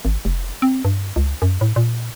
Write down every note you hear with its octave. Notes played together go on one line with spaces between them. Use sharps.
G#1
F1
C4
G2
C#2
F#2
A2
A#2